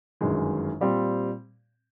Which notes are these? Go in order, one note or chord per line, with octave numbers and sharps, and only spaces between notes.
G1 F#2 D#3 G#3
A#2 G3 C4